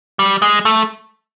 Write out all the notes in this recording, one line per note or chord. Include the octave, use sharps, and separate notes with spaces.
G3
G#3
A3